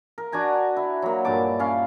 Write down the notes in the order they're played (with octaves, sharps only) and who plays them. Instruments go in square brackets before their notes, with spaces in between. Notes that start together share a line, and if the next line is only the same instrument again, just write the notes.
[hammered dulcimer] A#4
D4 F#4 G#5 A#5
E4
F#3 A#3
G2 A#2 A5 D6
C#4 F5